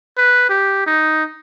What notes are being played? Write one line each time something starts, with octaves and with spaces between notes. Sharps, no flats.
B4
G4
D#4